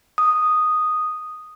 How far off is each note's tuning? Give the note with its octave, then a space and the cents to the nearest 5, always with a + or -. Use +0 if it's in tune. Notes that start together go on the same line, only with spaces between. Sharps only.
D#6 -5